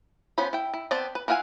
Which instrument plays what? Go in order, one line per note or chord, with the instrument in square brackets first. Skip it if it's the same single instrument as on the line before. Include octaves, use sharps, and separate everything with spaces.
[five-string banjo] F3 B3 C#4 C5 B5
E4 G5
E4
B3 C4 C5 D5 A5
B4
E4 F4 F5 F#5 G#5